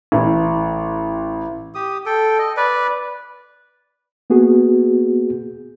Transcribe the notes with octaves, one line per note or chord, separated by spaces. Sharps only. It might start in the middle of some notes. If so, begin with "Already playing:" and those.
A1
G4 D#6
A4 G5
D#5
B4 D5
A#3 B3 F#4 G#4